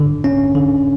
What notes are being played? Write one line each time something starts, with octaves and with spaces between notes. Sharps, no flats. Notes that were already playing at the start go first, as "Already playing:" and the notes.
Already playing: D3
C#4
D3